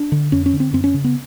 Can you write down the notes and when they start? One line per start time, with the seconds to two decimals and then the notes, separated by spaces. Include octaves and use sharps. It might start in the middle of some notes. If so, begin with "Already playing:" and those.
Already playing: D4
0.12 D3
0.32 F2 C#4
0.46 C#4
0.53 D3
0.60 C4
0.73 F#2 C4
0.84 C#4
0.94 C#3
1.04 B3